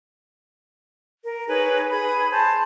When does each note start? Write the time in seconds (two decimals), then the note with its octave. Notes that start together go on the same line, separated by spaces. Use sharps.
1.25 A#4
1.48 D#4 G#4 B4 C#5
1.89 G#4 B5
2.31 C5 A5